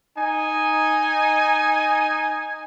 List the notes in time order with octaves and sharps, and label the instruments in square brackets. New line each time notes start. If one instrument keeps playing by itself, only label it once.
[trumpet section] D#4 G#5